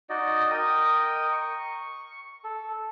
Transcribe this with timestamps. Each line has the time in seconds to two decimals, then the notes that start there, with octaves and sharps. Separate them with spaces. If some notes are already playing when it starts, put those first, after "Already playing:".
0.10 D#4 F#4 D5 D#5
0.51 A#4 D#5 G5 D#6
1.32 C#6
2.44 A4